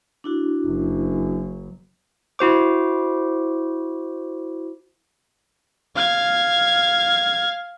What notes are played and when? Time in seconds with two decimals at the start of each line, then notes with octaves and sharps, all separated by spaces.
0.24 D4 E4 F#4
0.66 F#1 F#2
2.39 E4 F#4 C5 D6
5.96 F5 G#6